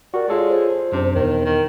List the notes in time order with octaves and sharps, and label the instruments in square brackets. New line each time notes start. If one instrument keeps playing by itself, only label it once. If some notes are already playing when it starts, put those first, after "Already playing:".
[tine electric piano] F#4 G4 A#4 [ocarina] D5
[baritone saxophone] G#3 [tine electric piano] F4 A4 C#5
[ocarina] C5
[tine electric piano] F#2 D4 [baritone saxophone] C3
[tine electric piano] E2 B2 [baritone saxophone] D#3
[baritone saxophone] D#3